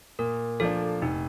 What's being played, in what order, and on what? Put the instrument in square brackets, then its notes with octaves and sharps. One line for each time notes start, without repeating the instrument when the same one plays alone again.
[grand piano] A#2 [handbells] A#4
[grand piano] F3 A#3 D4 [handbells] A4
[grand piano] F1 [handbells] D#4